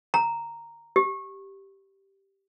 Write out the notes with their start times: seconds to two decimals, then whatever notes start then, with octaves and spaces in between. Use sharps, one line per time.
0.14 A#5
0.96 G4